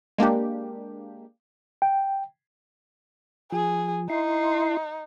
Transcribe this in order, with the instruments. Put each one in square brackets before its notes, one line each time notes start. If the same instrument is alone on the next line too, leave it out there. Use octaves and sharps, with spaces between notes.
[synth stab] G#3 A#3 D4 G4
[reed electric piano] G5
[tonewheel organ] F3 [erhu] G#4
[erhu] D#4 [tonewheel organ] E4 C6